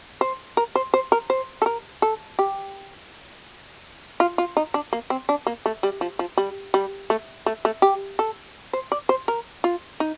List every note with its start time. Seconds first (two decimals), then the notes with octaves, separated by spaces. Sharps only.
0.21 C5
0.57 A#4
0.75 C5
0.94 C5
1.12 A#4
1.30 C5
1.62 A4
1.66 A#4
2.02 A4
2.39 G4
4.20 F4
4.38 F4
4.57 D#4
4.74 D4
4.93 A#3
5.10 C4
5.29 D4
5.47 A#3
5.66 A3
5.83 G3
6.01 F3
6.19 F3
6.37 G3
6.74 G3
7.10 A3
7.46 A3
7.65 A3
7.82 G4
8.19 A4
8.73 C5
8.92 D5
9.09 C5
9.28 A#4
9.64 F4
10.00 D#4